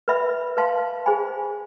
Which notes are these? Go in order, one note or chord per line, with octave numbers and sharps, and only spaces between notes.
B4 E5 B5
B4 F5 A5 C6
G#4 C5 G#5 B5